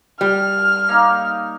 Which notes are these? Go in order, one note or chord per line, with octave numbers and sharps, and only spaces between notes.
G3 F6
A#3 D#4